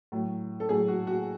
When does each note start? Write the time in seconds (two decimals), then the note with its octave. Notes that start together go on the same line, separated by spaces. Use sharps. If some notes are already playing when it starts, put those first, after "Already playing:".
0.12 A2 F#3
0.60 A4
0.69 A2 F#3 G#4
0.88 F#4
1.07 F#4